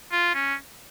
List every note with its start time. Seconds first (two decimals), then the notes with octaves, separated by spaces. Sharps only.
0.12 F4
0.35 C#4